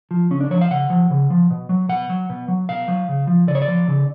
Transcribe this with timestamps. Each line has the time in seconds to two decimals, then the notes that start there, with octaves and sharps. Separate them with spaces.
0.11 F3
0.31 C#3 C#4
0.41 D4
0.50 F3 C#5
0.61 F5
0.71 C#3 F#5
0.90 F3
1.11 C#3
1.30 F3
1.50 B2
1.69 F#3
1.89 B2 F#5
2.09 F#3
2.30 B2
2.48 F#3
2.69 B2 F5
2.88 F#3
3.09 C#3
3.27 F3
3.47 C#3 D5
3.55 C#5
3.62 D5
3.68 F3
3.88 C#3